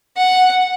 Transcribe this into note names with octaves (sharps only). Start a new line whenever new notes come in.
F#5